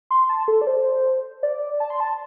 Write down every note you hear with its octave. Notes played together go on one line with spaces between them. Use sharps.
C6
A5
A4
D5
C5
D5
A5
C6
A5